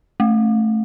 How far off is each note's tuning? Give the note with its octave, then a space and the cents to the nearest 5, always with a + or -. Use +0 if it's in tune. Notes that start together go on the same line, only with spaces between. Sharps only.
A3 +0